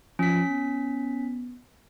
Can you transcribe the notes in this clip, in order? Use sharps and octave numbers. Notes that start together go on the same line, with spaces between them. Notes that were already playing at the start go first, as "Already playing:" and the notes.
F3 C#4 B6
B3